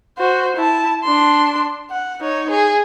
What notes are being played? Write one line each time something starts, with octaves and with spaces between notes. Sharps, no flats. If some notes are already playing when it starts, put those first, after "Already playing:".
F#4 C5
E4 A5
D4 C6
F#5
D#4 C#5
G#4